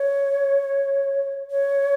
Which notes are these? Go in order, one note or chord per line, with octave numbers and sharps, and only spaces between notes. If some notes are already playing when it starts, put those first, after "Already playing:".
Already playing: C#5
C#5